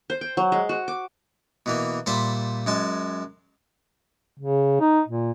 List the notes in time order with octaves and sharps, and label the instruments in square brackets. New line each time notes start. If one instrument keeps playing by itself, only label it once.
[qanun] C5
G5
F#3
G#3
F#4
D6
[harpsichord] B2 E3 A#3
A#2 G3 C5 E5 A5 B5
F#2 G#3 A5
[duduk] C#3
D#4
A#2